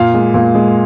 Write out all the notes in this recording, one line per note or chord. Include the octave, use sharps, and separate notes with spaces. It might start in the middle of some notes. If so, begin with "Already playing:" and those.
Already playing: A#2 F5
G#3
A#2
G#3